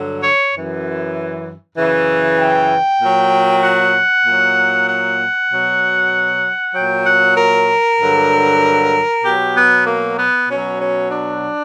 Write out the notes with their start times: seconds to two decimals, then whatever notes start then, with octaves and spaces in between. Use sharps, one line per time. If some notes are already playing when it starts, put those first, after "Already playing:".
Already playing: G2 D3 F#3
0.21 C#5
0.52 F#2 E3
1.76 F#2 C#3 E3
2.38 G5
3.01 A#2 F#3
3.63 F#5
4.25 A#2 F#3
4.88 F#5
5.51 B2 F#3
6.74 A#2 F#3 G5
7.06 F#5
7.36 A#4
8.00 G2 D3 F#3
9.24 B2 F#3 G4
9.55 B3
9.87 A#3
10.18 B3
10.48 B2 F#3 C#4
10.79 C#4
11.11 D4